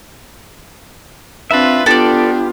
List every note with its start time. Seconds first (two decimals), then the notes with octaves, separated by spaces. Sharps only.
1.51 C4 D4 F4 B4 E5
1.86 B3 D4 F4 G4 A4 D5